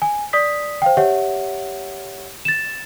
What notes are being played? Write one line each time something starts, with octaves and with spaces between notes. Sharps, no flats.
G#5
D5 D#6 B6
C5 F5 G5
G4 C#5 E5 F#5
A6 E7